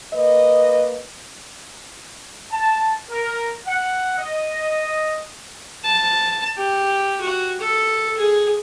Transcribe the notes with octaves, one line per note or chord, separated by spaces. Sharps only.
A#3 B4 D#5
A5
A#4
F#5
D#5
A5
G4
F#4
A4
G#4